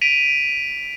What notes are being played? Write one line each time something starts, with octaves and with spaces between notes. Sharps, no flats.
B6 D7 D#7 F7